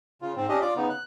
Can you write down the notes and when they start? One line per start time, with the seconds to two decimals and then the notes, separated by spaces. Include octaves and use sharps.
0.22 C#3 F4
0.36 G#2 C4
0.49 C#4 D4 G4 D#5
0.61 F4 D5 D6
0.76 C#3 B3 D#4
0.90 F#6